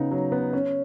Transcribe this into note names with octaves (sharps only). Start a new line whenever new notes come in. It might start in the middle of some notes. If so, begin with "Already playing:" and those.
Already playing: C#3 B3 D#4
F#3
B3
C#4